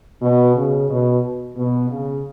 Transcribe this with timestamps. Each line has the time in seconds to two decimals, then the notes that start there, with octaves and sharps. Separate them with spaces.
0.22 B2
0.56 C#3
0.89 B2
1.57 B2
1.90 C#3